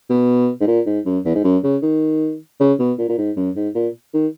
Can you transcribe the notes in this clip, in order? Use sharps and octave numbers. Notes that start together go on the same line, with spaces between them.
B2
G#2
A#2
G#2
F#2
E2
G#2
F#2
C#3
D#3
C#3
B2
A#2
A#2
G#2
F#2
G#2
A#2
D#3